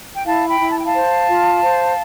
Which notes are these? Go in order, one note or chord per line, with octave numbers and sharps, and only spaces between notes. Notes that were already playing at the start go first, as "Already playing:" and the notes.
G5
E4 F5 A5
G5 B5
E4
A5
G5
F5 A5
C5
F4
C5